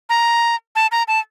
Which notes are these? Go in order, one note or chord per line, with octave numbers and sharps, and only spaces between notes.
A#5
A5
A#5
A5